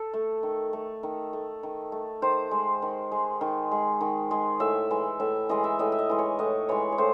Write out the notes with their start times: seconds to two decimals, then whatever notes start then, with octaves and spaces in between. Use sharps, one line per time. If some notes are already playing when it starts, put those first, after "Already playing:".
Already playing: A4
0.13 A3
0.43 D#3
0.73 A3
1.03 D#3
1.33 A3
1.63 D#3
1.92 A3
2.22 D#3 C5
2.51 G#3
2.82 D#3
3.11 G#3
3.41 D#3
3.71 G#3
4.01 D#3
4.31 G#3
4.60 A2 E5
4.90 E3 G#3
5.20 A2 E5
5.49 E3 G#3 D#5
5.64 E5
5.79 A2 D#5
5.92 E5
5.99 D#5
6.09 E3 G#3
6.19 C#5
6.39 A2 D#5
6.69 E3 G#3 C#5
6.92 C#5
6.98 A2 C5